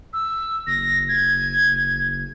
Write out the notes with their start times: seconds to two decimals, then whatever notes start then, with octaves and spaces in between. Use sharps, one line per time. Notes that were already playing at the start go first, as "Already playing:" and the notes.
0.13 E6
0.67 F#1 A#6
1.09 G#6